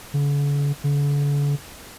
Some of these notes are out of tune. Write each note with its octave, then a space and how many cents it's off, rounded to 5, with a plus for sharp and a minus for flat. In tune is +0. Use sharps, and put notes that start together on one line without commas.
D3 -45
D3 -40